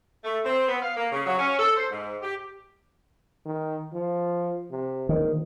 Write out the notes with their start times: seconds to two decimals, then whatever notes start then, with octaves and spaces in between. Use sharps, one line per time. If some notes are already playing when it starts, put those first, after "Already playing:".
0.24 A3
0.45 C4
0.68 B3
0.82 F5
0.96 A#3
1.12 C#3
1.26 F#3
1.38 C#4
1.59 A4
1.76 C5
1.90 G#2
2.22 G4
3.45 D#3
3.93 F3
4.71 C3
5.09 A#1 D#3